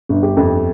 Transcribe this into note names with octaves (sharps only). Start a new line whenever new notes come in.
G1
G4
F2